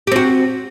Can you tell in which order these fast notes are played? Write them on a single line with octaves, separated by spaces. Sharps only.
G4 C4 F#4